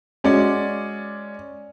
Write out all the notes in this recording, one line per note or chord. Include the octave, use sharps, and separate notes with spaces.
G#3 C#4 F#4 D5